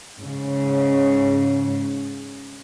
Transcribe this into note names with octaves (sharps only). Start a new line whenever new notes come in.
G#2 C#3